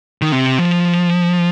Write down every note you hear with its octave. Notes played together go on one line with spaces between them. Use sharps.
D#3
C3
F3